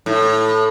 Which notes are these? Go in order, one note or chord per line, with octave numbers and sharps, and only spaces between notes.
A2